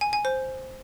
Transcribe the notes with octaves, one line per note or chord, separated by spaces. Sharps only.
G#5
G#5
C5